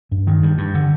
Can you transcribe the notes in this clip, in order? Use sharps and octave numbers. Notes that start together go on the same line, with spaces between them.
G2
D#3
G2
G2
D3